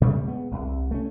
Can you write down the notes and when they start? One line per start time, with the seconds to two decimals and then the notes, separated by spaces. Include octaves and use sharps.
0.01 A#2 C#3 G3 A3
0.24 G#3 B3
0.51 E1 C2
0.91 A3 C#4